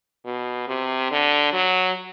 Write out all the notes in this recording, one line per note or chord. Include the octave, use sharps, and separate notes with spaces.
B2
C3
D3
F#3